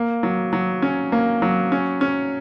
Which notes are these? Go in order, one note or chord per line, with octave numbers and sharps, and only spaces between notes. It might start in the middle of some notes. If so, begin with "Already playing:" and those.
Already playing: A#3
F#3
F#3
C#4
A#3
F#3
C#4
C#4